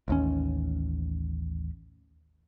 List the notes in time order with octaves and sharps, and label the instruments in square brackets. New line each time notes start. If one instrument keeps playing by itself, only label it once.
[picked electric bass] A1 D#2 C#4